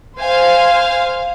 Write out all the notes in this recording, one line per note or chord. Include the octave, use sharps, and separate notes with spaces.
C5 F5 G#5